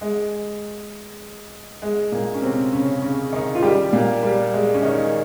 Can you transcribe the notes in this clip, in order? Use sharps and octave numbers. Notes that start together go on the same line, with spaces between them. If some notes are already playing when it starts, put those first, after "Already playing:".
G#3
G#3
A#2 A#3
C#4
C3 C4
C#3 C#4
C#3 C#4
D#3 D#4
F4
G3 G4
A#2 A#3
G3
G#3
C#4
D#3 D#4